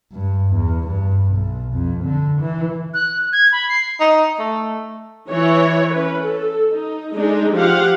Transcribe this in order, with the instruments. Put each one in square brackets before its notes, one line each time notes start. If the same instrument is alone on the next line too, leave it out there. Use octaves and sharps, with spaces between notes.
[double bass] G2
E2
G2
B1
F2
D3
E3
[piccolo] F#6
G#6
B5
C7
[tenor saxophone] D#4
A3
[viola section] E3 C#5
C#4 B4
A4
D#4
G#3 D4 D#4 A4
F3 G4 F5 F#5